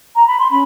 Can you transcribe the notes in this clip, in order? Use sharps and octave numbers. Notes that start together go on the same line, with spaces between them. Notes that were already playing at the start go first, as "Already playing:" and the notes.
A#5
B5
C6
C#4 B5